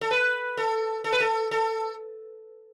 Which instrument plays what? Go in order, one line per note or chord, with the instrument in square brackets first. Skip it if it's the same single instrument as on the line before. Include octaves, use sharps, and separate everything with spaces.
[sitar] A4
B4
A4
A4
B4
A4
A4